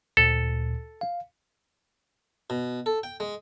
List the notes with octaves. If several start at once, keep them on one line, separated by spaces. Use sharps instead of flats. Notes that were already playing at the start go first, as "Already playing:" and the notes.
D2 A#2 A4
F5
B2
A4
G5
G#3